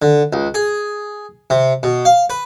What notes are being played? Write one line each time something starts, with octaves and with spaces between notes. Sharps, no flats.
D3
C#2
G#4
C3
B2
F5
B4